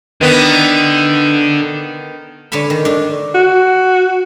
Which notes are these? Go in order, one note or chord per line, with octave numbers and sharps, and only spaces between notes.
D3 D#3 B3
D3 C#5 G#5 A5 B5
D#3
A3 D4
F#4